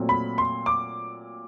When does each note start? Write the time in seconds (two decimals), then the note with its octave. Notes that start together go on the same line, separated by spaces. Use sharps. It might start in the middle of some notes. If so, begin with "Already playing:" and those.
Already playing: A#2 F#3 A3 C4
0.09 B5
0.38 C6
0.66 D6